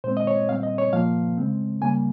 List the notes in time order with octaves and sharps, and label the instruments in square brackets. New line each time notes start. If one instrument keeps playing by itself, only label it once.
[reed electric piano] A#2 G#3 C4 C5
D#5
C#5
A#2 G3 C4 F5
D#5
C#5
A#2 F3 A#3 F5
C#3 G#3 C4
C#3 G3 A#3 G#5